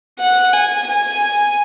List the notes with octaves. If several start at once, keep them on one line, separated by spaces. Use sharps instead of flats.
F#5
G#5
G#5